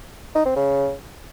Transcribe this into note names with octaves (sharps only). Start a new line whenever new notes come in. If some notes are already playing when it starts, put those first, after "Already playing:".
D#4
C4
C#3